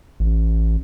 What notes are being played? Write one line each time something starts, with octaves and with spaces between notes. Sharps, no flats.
A1